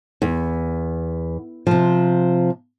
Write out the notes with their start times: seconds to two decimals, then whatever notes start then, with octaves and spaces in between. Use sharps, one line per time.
0.22 E2
1.67 C3 F3